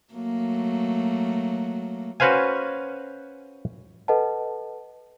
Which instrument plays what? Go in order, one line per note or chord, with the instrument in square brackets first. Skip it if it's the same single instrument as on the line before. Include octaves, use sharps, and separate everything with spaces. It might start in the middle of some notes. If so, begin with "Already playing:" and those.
[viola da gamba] F#3 A3 A#3
[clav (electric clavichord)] C#4 F#4 B4 C5 F5 G#5
[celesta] A4 B4 D#5 F#5 A5